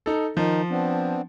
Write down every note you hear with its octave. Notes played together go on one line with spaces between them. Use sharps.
D#4 A4
D#3 F3 D#4
B3 C4 D4